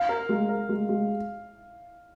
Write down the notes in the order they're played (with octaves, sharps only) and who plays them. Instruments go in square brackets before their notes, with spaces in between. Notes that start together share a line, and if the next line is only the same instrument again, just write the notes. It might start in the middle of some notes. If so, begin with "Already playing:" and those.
Already playing: [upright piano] F5
[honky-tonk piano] A#4
G#3
A#4
G#3
G#3